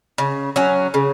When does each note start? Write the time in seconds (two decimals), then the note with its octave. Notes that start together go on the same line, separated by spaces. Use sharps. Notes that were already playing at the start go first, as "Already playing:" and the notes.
0.18 C#3
0.56 F#3 C#4
0.94 C#3